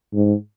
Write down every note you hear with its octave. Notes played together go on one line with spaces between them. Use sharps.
G#2